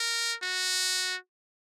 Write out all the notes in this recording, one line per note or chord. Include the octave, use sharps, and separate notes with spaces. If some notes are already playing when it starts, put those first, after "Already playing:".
Already playing: A#4
F#4